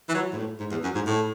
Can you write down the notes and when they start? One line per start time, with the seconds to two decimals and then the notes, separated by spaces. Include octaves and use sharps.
0.09 E3
0.14 F#3
0.33 G#2
0.37 A2
0.60 G#2
0.71 E2
0.83 F#2
0.95 G#2
1.06 A2